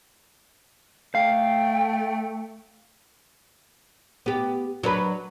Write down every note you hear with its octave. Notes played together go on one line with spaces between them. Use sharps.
A3 F5 G5
B3 G4
F#3 D4 B4